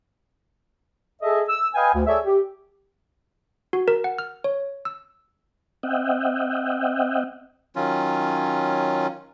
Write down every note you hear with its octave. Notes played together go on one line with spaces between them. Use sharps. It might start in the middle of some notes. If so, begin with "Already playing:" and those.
G#4 A4 D#5 E5
E6
B4 D#5 F5 G5 G#5
D2
G#4 A4 C#5 D5 E5
G4
F#4
A#4
F#5
F6
C#5
E6
C4 D#5 E5 F#5 G5
D#3 F#3 C#4 F4